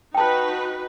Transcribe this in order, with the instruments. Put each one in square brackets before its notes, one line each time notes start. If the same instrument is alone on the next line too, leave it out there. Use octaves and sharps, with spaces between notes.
[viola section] D#4 F#4 B4 [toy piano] G5 A5